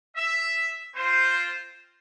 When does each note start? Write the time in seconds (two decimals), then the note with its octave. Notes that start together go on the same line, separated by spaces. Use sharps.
0.16 E5
0.94 C4 F4 C5